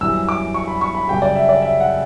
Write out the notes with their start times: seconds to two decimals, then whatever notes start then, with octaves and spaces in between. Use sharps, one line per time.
0.01 F#2 E3 G3 E6
0.29 D6
0.54 C#6
0.68 B5
0.81 C#6
0.95 B5
1.08 F#2 C#3 G3 G5
1.22 D5
1.35 E5
1.49 D5
1.62 E5
1.80 F#5